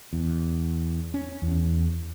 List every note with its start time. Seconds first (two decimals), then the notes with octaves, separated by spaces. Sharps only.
0.13 E2
1.14 C#4
1.42 E2